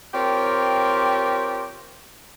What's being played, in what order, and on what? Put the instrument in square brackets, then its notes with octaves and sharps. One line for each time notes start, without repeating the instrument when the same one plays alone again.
[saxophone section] C4 F4 G4 A#4 C#5